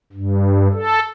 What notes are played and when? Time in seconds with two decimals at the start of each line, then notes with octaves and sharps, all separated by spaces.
0.13 G2
0.74 A4